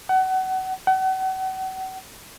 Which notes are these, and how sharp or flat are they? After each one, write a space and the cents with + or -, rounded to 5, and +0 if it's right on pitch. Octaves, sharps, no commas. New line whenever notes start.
F#5 +30
F#5 +40